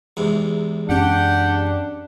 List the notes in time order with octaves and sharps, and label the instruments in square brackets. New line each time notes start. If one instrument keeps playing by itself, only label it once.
[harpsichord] E2 G#2 C3
[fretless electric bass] F#2 C#4 [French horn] D4 [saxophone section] G4 F#5